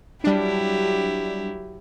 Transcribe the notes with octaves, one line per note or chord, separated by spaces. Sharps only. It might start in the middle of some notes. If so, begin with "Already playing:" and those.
F#3 G3 D4 E4 G4